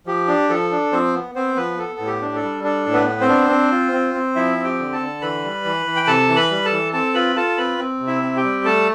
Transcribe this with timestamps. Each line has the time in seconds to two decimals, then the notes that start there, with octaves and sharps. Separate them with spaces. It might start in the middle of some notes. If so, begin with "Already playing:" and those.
0.06 F3 G4
0.28 D4
0.49 F3 A4
0.71 D4
0.92 F3 C4 C5
1.14 B3
1.35 B3 C4 C5
1.56 F3 B3 B4
1.78 B3 A4
1.99 A2
2.07 G4
2.21 D4
2.35 A4
2.43 G3
2.64 D4 A4
2.86 A2
2.93 B3 B4
3.07 B3
3.21 C4 C5
3.28 D4
3.50 C4
3.71 F4
3.92 C4
4.14 C4
4.36 F3 E4 E5
4.58 C4
4.64 G4 G5
4.79 D3
4.92 A4 A5
5.00 D3
5.21 E3 B4 B5
5.43 G3
5.65 E3
5.86 E3
5.96 G5
6.07 C3 A4 A5
6.29 E3
6.36 B4 B5
6.51 G3
6.65 A4 A5
6.72 E3
6.93 C4 A4 A5
7.14 F4 B4 B5
7.36 F4 A4 A5
7.58 C4 B4 B5
7.78 C4
8.00 C3
8.07 E4 E5
8.23 C4
8.37 G4 G5
8.44 G3
8.65 A3 A4 A5